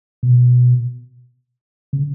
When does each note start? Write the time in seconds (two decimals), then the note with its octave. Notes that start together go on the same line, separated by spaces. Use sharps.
0.23 B2
1.93 C#3